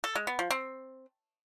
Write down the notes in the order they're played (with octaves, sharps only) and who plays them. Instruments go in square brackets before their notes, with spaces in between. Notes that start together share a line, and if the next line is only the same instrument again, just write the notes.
[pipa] A4
G#3
B3
F3
C4